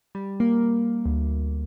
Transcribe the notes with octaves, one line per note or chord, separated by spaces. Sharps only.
G3
A#3
D2